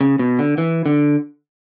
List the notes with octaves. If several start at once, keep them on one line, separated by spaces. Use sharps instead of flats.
C#3
B2
D3
E3
D3